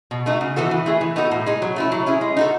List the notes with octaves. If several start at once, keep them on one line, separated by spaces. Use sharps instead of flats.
B2
A3 D#4 F#4
C#3
E3 B3 F#4 A4
E3
A3 E4 G#4
E3
B3 D#4 F#4 A4
A2
G#3 D#4
F#3
A3 C#4 E4
F#3
C#4 E4 G#4
G#3
D#4 F#4 A4